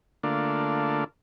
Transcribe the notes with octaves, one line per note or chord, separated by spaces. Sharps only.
D3 A3 A#3 D4 F4